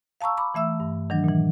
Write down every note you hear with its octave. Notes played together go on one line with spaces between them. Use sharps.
F5 A5 A#5 C#6 E6
B5 D6
E3 A3 E5 E6
G2
D#3 E3 F#3 D4
A#2 E3